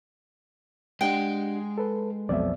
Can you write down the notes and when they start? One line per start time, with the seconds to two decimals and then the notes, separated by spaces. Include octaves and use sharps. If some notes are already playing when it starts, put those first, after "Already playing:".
1.01 G#3 D4 G4 D#5 F#5 G5
1.78 A4 B4
2.29 B1 F2 B2 D5 E5